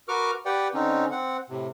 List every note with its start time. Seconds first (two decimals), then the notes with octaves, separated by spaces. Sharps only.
0.08 F#4 A#4 B4 C#6 D6 F6
0.45 G4 B4 D5 F#5 G5
0.74 D3 C4 C#4 D#4
1.11 C4 F#5
1.50 A2 C3